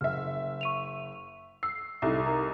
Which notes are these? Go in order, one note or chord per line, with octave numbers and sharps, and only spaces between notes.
F#1 E5 F6
C#6 D#7 F7
E6 C7
C2 D#4 A4 E5
A#4 A#5